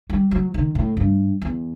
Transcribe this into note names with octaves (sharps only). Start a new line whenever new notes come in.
G3
F#3
D#3
A2
G2
E2